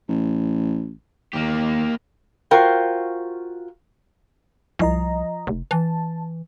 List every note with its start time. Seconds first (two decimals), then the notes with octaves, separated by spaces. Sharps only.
0.09 A1
1.33 D#2 A#3 G4
2.51 F4 F#4 A#4 C5 G5
4.79 C2 F3 D#5 A#5
5.47 F1
5.71 E3 A5